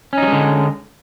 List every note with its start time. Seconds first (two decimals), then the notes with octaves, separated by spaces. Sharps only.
0.13 C#4
0.18 D#4
0.23 F#3
0.27 G#3
0.32 D3